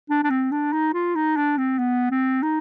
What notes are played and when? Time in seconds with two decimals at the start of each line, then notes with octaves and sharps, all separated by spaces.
0.10 D4
0.24 D4
0.30 C4
0.51 D4
0.73 D#4
0.94 F4
1.15 D#4
1.37 D4
1.57 C4
1.78 B3
2.11 C4
2.43 D#4